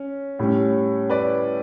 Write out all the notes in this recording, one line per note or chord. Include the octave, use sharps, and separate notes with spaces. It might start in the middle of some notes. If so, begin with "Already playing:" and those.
Already playing: C#4
A2 G3 C#4
B4 D5